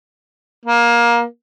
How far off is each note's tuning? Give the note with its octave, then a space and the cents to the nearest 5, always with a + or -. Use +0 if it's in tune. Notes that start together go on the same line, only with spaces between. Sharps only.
A#3 +20